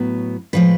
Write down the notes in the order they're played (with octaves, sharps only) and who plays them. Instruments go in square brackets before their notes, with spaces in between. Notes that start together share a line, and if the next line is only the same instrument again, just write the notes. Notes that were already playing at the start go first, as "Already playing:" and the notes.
Already playing: [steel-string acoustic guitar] A2 F#3 B3
A2 F3 G#3 B4